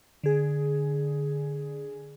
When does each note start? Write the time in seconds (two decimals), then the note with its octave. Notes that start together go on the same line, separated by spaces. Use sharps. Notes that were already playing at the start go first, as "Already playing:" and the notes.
0.24 D3 G#4